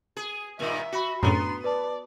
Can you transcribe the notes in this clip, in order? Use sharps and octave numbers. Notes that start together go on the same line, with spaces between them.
G#4
G2 A#2 D#3 E5
F#4 B5 C#7
F#2 A2 C#3 B3 D4 A#5 C6
B4 D5 A5